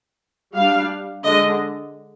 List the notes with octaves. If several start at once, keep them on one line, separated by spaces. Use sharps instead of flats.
G3 D4 F5
D3 G#3 D4 D#5